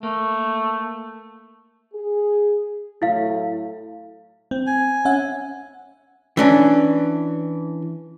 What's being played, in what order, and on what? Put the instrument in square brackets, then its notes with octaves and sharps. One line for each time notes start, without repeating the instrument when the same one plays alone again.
[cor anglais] A3 [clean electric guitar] A#3
[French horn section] G#4
[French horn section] A2 F#3 A3 [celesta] E4 F5
[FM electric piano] C4
[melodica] G#5
[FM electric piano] C#4 E5 F#5
[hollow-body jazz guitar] E3 C#4 D4